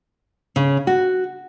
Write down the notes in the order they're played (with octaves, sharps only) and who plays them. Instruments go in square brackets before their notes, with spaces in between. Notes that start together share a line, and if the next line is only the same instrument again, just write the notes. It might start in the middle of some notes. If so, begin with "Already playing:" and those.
[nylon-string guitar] C#3
F#4